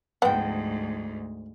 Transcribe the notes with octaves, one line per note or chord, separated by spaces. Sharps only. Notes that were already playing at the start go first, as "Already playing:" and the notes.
D2 G#2 F3 B3 F#5 G5